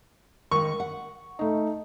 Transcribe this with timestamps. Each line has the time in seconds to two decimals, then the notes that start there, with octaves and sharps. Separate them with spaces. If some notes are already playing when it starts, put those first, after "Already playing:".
0.51 D#3 G#3 C#6
0.80 F#5
1.39 A3 D#4